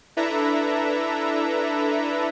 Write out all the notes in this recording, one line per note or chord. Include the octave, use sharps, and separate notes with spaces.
D4 E4 A4 B4 E5 A#5